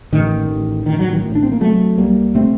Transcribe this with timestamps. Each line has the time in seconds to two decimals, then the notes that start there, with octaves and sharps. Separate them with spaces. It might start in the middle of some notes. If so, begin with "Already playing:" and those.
0.12 A1 D#3
0.49 A1
0.86 A1 D#3
0.99 F#3
1.12 D#3
1.24 A2
1.35 D4
1.43 C4
1.52 A#3
1.60 C3 F#3 A3
1.98 C2 G3 A#3
2.35 C3 A3 C4